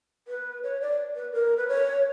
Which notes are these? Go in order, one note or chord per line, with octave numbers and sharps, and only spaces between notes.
B4
C#5
D5
B4
A#4
B4
C#5